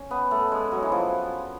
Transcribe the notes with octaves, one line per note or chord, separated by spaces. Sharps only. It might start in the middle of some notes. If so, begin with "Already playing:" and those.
Already playing: C#4
B3
A3
G#3
F#3
E3
F3